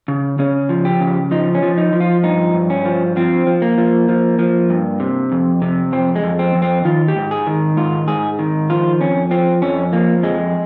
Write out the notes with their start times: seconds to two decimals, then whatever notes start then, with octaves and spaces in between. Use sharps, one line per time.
0.08 C#3
0.39 C#3 C#4
0.69 F3
0.85 G4
1.00 C#3
1.31 F3 D#4
1.55 C#4
1.62 F3
1.78 D#4
1.93 F3
2.00 F4
2.23 G2 D#4
2.54 G2
2.70 C#4
2.85 F3
3.16 F3 C4
3.47 F3
3.62 A#3
3.78 F3
4.09 F3
4.39 F3
4.70 G2
5.00 C3
5.32 F2
5.62 C3
5.92 F2 C4
6.16 G#3
6.23 F2
6.39 C4
6.55 F2
6.62 C4
6.85 D#3 F4
7.08 G4
7.16 G#2
7.31 G#4
7.47 D#3
7.77 G#2 F4
8.08 G#2 G#4
8.39 D#3
8.70 F3 F4
9.00 F2 C#4
9.31 F3 C4
9.62 F2 C#4
9.92 F3 A#3
10.23 F2 G#3